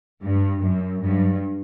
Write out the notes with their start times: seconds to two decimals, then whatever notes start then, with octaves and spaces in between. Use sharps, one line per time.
0.23 G2
0.62 F#2
1.01 G2